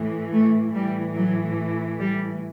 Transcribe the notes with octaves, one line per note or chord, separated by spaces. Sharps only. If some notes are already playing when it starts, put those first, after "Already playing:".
Already playing: A2 E3
A3
A2 E3 G3
F#3
G3